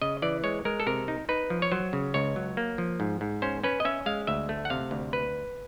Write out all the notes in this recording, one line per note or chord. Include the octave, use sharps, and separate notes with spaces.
C#3 D#5
E3 D5
G#3 C#5
G#3 A#4
A4
C3 A#4
D#4
D#4 B4
F3
C#5
F#3 C5
C#3
C#2 C#5
F#3
A#3
F3
G#2
G#2
C#4 C5
C#4 B4
D#5
C#4 E5
G#3 F5
D2 E5
A3
F#5
C3 F5
D2
B4